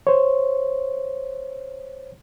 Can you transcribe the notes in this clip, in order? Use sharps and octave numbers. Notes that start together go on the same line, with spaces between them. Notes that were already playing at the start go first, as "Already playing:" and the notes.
C5 C#5